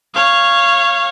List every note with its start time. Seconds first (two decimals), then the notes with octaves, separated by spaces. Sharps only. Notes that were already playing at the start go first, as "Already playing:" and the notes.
0.14 C#5 F5